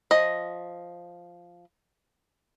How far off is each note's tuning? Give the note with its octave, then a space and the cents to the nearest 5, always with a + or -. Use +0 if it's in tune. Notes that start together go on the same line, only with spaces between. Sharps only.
F3 +0 D#5 +0